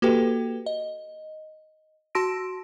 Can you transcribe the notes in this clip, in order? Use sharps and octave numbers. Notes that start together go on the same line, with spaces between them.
A#3 F#4 G4 A4 B4 G5
D#5
F#4 A5 C6 E6 A#6 D7